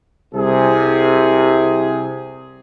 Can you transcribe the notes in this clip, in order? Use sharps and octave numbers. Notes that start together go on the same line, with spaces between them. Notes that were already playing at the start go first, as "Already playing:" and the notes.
C2 C3 G#4